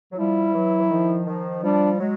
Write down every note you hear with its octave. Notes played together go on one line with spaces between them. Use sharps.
F#3
F3 G3 E4
F3
E3 F#3
E3
D#3 F3
D#3 F3
F3 G3 D4
F#3 G#3